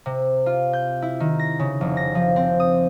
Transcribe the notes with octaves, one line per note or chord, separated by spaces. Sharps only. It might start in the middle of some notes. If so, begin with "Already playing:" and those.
C3
F4
G6
E4
D#3
A#6
C#3
F1
A#6
F3
C4
D#6